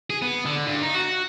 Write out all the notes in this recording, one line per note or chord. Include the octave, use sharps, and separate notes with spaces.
G#4
B3
D3
G2
D#4
F#4